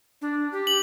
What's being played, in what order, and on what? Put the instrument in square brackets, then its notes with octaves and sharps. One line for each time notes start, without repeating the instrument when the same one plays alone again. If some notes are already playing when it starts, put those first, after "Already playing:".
[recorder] D4
G4
[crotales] F#7